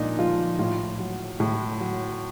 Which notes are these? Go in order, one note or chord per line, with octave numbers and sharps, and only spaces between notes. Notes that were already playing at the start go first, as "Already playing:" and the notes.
Already playing: A#2 F3 D4 D#4
F3 F4
A2 F4
F#3
A2
F#3